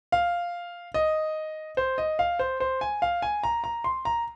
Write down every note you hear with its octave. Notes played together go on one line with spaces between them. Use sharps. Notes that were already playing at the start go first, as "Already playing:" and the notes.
F5
D#5
C5
D#5
F5
C5
C5
G#5
F5
G#5
A#5
A#5
C6
A#5